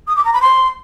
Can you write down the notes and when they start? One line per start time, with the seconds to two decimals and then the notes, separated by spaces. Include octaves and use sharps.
0.07 D#6
0.16 D6
0.24 A#5
0.33 B5
0.41 C6